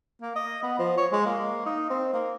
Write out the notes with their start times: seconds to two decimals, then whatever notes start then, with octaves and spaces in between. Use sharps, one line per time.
0.21 A#3
0.36 D#5
0.63 B3
0.79 F3
0.97 C#5
1.12 G#3
1.26 A#3
1.66 D#4
1.90 C4
2.13 A#3